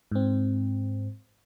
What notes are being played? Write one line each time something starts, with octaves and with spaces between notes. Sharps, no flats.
G#2 C4